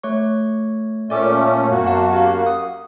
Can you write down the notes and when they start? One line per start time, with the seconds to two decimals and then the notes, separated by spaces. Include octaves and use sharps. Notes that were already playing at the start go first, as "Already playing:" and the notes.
0.03 A3 C#5 C#6
1.10 A#2 A3 C#4 D5 D6 E6
1.71 F#2 A#3 B3 F#4
1.86 F5 F#5 A5
2.13 G4 F5
2.46 D#6